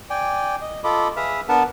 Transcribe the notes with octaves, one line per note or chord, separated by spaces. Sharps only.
D5 G5 G#5
D#5
F4 A4 D#5 B5 D6
G#4 B4 E5 F5
B3 D4 A#4 B4 F#5 A5